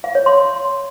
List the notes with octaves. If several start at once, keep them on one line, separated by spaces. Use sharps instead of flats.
F5
C#5
C6